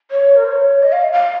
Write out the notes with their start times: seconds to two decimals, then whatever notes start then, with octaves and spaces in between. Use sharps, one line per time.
0.11 C#5
0.36 A#4
0.44 C5
0.52 C#5
0.83 D#5
0.92 F5
1.13 F5